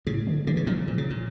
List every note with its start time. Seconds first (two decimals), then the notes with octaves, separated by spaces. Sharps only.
0.07 A2 C#3
0.27 D3
0.47 D3 E3
0.57 C#3
0.66 A#2 D3 F3
0.88 A#2
0.98 C#3
1.10 A#2